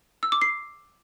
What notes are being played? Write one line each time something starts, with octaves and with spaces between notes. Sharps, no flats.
E6
D6
C7